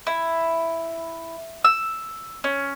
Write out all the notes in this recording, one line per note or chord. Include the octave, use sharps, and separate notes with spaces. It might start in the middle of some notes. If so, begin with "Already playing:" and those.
E4
E6
C#4